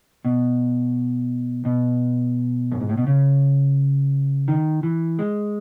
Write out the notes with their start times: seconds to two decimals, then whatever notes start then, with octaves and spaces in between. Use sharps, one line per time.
0.25 B2
1.65 B2
2.71 F#2
2.80 G#2
2.89 A2
2.97 B2
3.07 C#3
4.48 D#3
4.83 E3
5.19 G#3